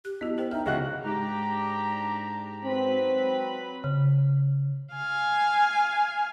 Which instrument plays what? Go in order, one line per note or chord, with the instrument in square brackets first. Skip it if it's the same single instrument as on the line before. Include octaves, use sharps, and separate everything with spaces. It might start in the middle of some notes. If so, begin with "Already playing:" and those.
[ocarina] G4 [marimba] F#6
[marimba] B3 F#4 [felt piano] D4 E4 D#5
[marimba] G4 A#4 G5 [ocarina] C5
[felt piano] D#4 G5 [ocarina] E5 [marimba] F6
[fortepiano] C#2 F#4 F#6 [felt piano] C#3 [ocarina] D#5
[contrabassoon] G#2 [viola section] D4 G4 A#5
[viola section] F#3 B4 B5 [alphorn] C4
[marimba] C#3
[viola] F5 G#5